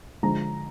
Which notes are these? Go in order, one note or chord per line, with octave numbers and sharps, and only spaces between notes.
D3 F3 G#3 A#5